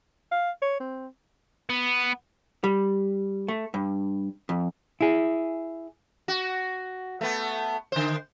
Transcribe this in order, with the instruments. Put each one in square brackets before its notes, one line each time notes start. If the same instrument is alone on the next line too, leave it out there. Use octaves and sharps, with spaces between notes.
[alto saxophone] F5
C#5
C4
[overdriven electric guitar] B3
[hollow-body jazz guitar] G3
A3
G2
F2
E4 G#4
[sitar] F#4
A3 B3
D3 C5